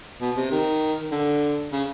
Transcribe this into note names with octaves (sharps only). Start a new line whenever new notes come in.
B2
C3
D#3
D3
C#3